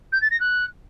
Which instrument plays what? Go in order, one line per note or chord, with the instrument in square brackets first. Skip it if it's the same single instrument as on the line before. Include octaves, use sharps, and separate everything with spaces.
[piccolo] G6
A6
A#6
F#6